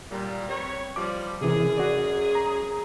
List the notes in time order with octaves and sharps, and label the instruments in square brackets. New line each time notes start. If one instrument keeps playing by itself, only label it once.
[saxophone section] A#2 G3
C4 B4 C#5
[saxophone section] F3 G3 [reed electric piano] D6
[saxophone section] F#2 G#4 [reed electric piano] C3 E3
[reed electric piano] F#4 D5
A#5